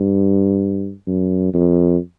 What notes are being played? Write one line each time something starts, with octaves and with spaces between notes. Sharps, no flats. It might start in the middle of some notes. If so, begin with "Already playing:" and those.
Already playing: G2
F#2
F2